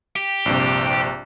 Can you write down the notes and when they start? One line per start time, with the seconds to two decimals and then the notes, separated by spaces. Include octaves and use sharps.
0.16 G4
0.46 A#1 G2 C3